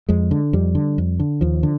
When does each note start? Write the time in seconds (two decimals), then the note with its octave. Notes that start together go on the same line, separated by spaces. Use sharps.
0.09 F2 G#3
0.31 D3
0.53 F2 G3
0.75 D3
0.98 F2
1.20 D3
1.41 D#2 F3
1.63 D3